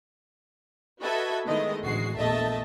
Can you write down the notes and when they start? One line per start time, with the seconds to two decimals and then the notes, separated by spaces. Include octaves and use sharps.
1.01 F#4 A4 B4 D#5 E5 G#6
1.46 D#3 G#3 A3 B3 E4 D#5
1.82 A1 D2 G#3 F#4 C7
2.17 A#1 E2 A3 D#5 E5 A5